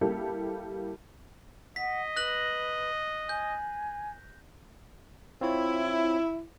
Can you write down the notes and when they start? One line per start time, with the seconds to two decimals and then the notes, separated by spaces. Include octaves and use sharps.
0.01 G3 A#3 E4 G4 A4
1.76 D#5 F#5 B6
2.16 B4 F#6 A#6 F#7
3.29 G#5 G6
5.41 C4 E4 F4 C#5